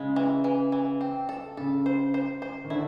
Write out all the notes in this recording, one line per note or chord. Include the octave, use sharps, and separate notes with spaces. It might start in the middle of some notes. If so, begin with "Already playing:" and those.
Already playing: C#3 G#3
E3
E3
E3
C4
A4
C#3 A4
C5
C5
C5
D#3
D3 E4